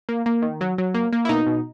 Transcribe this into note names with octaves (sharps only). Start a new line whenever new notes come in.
A#3
A#3
D#3
F#3
F#3
A#3
A#3
E4
B2 D#4
B2